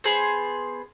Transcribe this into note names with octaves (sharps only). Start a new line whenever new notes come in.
B3 G#4 C5